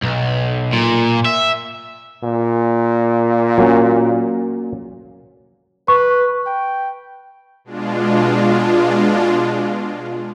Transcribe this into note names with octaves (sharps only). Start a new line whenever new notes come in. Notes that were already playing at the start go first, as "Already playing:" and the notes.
B1
A#2
E5
A#2
F#3 A#3 C#4
B4 C#6
G5
B2 G#3 D4 F4